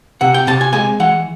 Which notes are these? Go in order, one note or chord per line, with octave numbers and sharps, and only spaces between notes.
C3 F#5
G5
C3 A5
G#5
G#3 G#5
E3 F#5